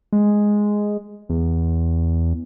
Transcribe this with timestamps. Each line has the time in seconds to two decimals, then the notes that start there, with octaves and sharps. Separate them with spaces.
0.13 G#3
1.29 E2